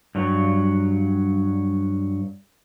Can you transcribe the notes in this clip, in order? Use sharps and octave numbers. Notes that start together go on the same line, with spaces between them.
G2 F#3